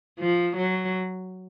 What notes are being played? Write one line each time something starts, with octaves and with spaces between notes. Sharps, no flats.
F3
F#3